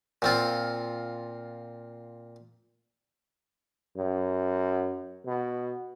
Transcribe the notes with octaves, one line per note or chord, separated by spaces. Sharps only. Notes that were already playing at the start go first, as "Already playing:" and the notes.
A#2 C4 F4
F#2
B2